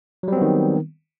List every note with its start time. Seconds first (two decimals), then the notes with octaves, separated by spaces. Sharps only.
0.23 F#3
0.28 G3
0.32 C4
0.37 B3
0.42 D#3